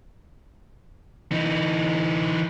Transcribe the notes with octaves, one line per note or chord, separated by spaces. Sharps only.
E3 D#4